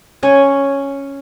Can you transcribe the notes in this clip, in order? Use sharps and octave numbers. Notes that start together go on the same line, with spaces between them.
C#4 C#5 G#5